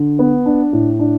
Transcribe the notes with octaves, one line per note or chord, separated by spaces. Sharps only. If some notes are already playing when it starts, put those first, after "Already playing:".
Already playing: D3
B3
D4
A2
D4